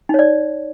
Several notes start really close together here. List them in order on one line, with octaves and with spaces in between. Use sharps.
D#4 C#5 D5